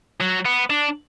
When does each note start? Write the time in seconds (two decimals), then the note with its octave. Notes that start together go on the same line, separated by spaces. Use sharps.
0.20 F#3
0.45 B3
0.70 D4